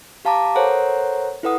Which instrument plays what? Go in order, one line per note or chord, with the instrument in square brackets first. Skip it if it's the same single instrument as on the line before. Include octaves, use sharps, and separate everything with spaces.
[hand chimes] G4 F5 A5 A#5 D6
A4 A#4 C5 C#5 F#5 A#5
E4 A4 B4 F#5 D#6